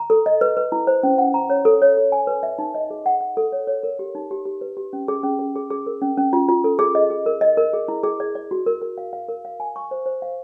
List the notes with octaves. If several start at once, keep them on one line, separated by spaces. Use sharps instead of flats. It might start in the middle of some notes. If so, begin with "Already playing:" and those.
Already playing: A#5
A4
D#5
B4
B4
E4
C5
C#4
F#5
A#5
C#5
A4
C#5
A4
G#5
B4
E5
D#4
D#5
G#4
F#5
F#5
A4
C#5
C#5
A#4
G4
D#4
G4
G4
B4
G4
C#4
G#4
C#4
G#4
G#4
G#4
A#4
C#4
C#4
F4
F4
A4
G#4
D#5
G#4
A#4
D#5
A#4
G#4
E4
G#4
D5
D5
F#4
A#4
A#4
F5
F5
A#4
F5
G#5
C#6
C5
C5
F5